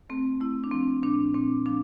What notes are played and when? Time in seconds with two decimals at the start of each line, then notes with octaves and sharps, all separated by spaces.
0.10 A3 C4
0.41 A3 E4
0.64 D4
0.71 F3 C4
1.03 A#2 D4
1.34 A#2 C4
1.66 F3 D4